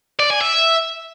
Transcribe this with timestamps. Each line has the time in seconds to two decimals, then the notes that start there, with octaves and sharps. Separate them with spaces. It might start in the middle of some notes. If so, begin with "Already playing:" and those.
0.20 D5
0.30 G#5
0.41 E5